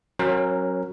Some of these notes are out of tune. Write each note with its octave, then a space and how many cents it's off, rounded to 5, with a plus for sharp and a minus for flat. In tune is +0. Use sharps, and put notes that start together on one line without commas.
F#3 +0 C#4 -25 A#4 +0